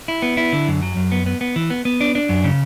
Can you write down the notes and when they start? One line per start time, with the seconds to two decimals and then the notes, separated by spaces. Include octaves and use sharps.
0.08 E4
0.22 B3
0.37 E4
0.52 D3
0.68 F#2
0.83 F#3
0.97 F#2
1.12 B3
1.26 B3
1.41 B3
1.56 E3
1.70 B3
1.85 B3
2.01 D4
2.15 D4
2.29 F#2
2.44 C#3